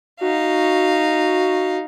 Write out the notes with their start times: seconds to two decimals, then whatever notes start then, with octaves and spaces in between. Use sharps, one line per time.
0.21 D#4 F#4 F5